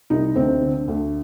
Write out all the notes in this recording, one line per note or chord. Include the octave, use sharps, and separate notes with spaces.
C2 D#4
D2 C4
D3
D2